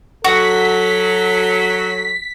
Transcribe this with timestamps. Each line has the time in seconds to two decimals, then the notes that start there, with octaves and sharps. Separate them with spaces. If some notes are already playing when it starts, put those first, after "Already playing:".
0.25 F#3 F#4 A4 B6